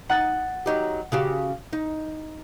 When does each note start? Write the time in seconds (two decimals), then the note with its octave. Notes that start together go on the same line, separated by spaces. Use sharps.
0.10 D#4 F#5 F#6 A6
0.66 F#3 D#4 G4
1.12 C#3 F#4 G4
1.73 D#4